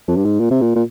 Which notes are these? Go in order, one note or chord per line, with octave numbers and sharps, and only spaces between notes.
F2
G2
G#2
A#2
C3
A#2
A#2